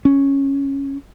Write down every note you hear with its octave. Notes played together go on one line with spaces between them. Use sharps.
C#4